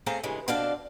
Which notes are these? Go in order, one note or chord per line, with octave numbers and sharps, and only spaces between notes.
A3 C4 G#4 A4 F5 A#5
G2 C#3 E3 G#3
B2 C4 D4 A4 D5 F5